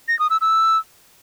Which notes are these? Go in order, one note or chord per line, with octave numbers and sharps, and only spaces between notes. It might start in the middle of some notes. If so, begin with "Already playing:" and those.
A#6
D#6
E6
E6